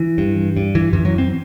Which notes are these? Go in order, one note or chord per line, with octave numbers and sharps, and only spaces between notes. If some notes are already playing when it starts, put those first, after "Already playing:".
Already playing: E3
G2
G2
E3
F#2 E3
F#3
C4